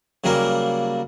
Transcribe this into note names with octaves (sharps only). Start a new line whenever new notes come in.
C#3 F#3 G3 A#3 A#4